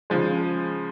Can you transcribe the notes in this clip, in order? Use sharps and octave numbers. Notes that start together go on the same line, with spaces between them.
C#3 F3 G#3